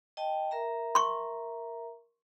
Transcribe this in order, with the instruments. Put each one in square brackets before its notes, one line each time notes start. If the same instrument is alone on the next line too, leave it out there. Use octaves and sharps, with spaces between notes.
[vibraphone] D#5 G5 A5
A#4 E5 A#5
[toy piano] C6 C#6